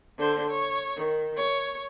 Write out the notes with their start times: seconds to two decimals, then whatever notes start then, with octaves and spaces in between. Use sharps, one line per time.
0.18 D3 C5
0.50 C#5
0.96 D#3
1.37 C#5